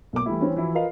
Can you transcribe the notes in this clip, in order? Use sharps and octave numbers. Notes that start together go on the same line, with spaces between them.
B1 A#3 D6
E3 G3 A3 E4
E3 C4 C#4
E3 F3 E4 F#4
F4 A#4 B4 D#5 F5